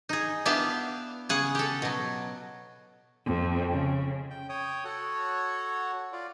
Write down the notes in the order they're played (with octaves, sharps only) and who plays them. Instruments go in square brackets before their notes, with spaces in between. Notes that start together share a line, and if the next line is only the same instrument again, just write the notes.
[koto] D#4 G#4
B3 D4 E4 G4 E5 F5
C#3 G#4 F#5
G4 A4
B2 F#3
[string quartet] F2
C#3
[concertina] G5
C#5 G5 D#6
F#4 A4 C#5 F#5
F4 D5